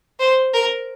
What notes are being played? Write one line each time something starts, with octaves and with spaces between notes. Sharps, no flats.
C5
A#4